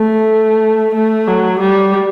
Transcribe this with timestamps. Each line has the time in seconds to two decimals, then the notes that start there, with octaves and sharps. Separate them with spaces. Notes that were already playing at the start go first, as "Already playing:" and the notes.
Already playing: A3
0.94 A3
1.28 F#3
1.60 G3